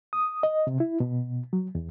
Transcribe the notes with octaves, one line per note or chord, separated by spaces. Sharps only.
D#6
D#5
C3
E4
B2
F#3
E2